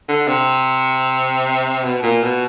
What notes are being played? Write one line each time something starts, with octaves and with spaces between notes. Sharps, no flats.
D3
C3
B2
A#2
B2